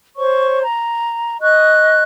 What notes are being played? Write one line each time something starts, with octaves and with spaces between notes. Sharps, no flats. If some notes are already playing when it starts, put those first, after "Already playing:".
C5 C#5 C#6
A#5
D#5 C#6 F#6